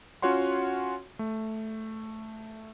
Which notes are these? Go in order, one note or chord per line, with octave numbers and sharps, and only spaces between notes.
C#4 F4 F#4 C#5 F#5 C6
A3